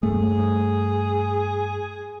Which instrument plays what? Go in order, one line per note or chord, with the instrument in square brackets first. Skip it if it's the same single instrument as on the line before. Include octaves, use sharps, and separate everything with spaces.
[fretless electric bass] G2 A3 [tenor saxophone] G#4